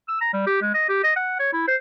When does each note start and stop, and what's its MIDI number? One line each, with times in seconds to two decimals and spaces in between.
0.08 0.20 88
0.21 0.31 82
0.33 0.46 55
0.46 0.60 67
0.62 0.70 56
0.74 0.84 75
0.89 1.01 67
1.04 1.11 75
1.16 1.38 78
1.39 1.52 73
1.53 1.67 64
1.68 1.76 72